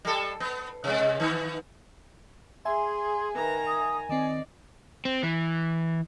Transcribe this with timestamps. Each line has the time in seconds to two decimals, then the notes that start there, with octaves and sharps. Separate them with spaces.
0.05 G3 A4
0.40 B3
0.84 C3 G#3
1.20 D#3 B3
2.65 G#4 E5 G#5 C6
3.35 D#3 B4 A#5
3.67 D#6
4.09 D#3 C4 D5 D#5
5.05 C4
5.23 E3